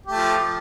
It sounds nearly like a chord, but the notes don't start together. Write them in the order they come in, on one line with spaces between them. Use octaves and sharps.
G4 A3 F3